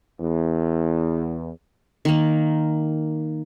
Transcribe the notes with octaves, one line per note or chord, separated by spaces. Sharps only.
E2
D#3 A#3